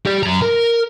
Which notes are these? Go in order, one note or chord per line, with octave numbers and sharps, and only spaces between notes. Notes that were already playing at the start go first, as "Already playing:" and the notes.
G4 D5
F#2 A#5
A#4